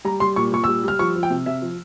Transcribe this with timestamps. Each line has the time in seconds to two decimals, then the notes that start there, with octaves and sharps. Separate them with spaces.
0.05 G3 A#5
0.20 G3 C6
0.36 A#2 C#6
0.52 A#2 C#6
0.64 E6
0.68 G3
0.84 G3 F6
0.99 F3 C#6
1.15 F3
1.23 G5
1.30 C3
1.46 C3 E5
1.62 F3